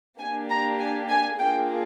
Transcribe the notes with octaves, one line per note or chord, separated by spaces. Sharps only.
A#3 D4 G4 G#5
A#5
G#5
G#5
A#3 D4 F4 G#4 G5